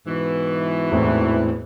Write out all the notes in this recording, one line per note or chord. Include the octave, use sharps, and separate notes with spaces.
G#2 B2 E3
E2 A2 C4